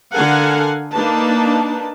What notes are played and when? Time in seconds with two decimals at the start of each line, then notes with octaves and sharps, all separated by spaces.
0.13 D3 A4 A#4 F5 F#5 G#5
0.93 A#3 D4 D#4 B4 A5